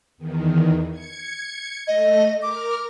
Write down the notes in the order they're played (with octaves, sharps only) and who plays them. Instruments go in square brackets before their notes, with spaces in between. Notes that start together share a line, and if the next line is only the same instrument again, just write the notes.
[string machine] E2 D#3
G#6 C#7
[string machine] A3 [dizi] D#5
[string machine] A#4 F6 [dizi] D6